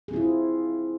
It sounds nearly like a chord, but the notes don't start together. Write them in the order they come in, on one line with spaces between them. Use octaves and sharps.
G#4 C4 E4 F4